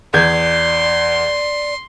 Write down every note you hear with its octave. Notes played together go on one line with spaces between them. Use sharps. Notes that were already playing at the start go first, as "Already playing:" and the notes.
E2 D5 C6 G6 G#6